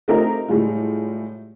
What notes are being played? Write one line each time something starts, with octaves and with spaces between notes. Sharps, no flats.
A3 C4 D#4 F4 G4 A#4
A2 G3 G#3 F4